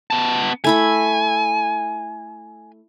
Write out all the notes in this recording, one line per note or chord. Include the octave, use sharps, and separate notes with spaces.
B3 A5
A3 E4 G#5 B5